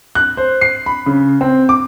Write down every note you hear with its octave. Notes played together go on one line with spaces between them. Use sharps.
F#6
C5
C7
B5
C#3
C4
D6